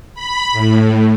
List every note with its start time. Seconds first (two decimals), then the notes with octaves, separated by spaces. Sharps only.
0.14 B5
0.52 A2